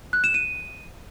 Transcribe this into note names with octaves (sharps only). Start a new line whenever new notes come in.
F#6
E7
D#7